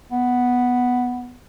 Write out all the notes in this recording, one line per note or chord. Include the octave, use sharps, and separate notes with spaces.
B3